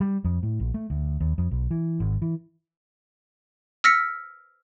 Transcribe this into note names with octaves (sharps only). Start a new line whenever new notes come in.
G3
F2
A2
A#1
A3
D2
D#2
F2
B1
E3
G#1
E3
E6 F6 A#6 B6 C#7